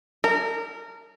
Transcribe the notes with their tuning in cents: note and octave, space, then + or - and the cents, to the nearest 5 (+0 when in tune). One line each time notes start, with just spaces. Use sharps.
A#4 -25